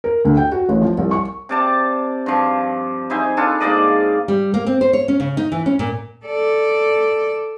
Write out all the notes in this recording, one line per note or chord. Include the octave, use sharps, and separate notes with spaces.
A#4
D2
G5
F#4
A1
F3
C2
C#6
C3 D5 A5
G2 F3
D#4 E4 C5 G#5
D4 F4 A4
G#2 A#3 D5 D#5
F5
G3
A#3
C4
C5
C#5
C#4
C#3
D#4
E3
C#4
A#2
A4 D5